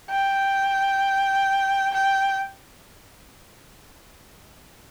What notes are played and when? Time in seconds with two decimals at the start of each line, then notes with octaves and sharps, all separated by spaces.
0.10 G5
1.94 G5